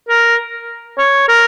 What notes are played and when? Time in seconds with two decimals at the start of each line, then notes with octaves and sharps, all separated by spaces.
0.09 A#4
0.98 C#5
1.28 A#4